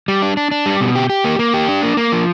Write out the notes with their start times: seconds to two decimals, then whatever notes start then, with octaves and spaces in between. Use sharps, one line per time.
0.08 G3
0.22 D4
0.37 D4
0.51 D4
0.66 G3
0.81 B2
0.96 G4
1.10 G4
1.24 A#3
1.39 A#3
1.54 G4
1.68 D4
1.83 A#3
1.97 A#3
2.12 F3